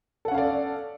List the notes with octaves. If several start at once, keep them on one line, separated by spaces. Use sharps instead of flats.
C#4 A4 D5 F5 F#5